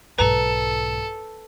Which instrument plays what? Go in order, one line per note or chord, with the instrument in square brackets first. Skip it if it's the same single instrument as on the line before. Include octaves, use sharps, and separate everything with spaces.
[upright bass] B1 G#2 [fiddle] A4 [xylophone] B4 A#5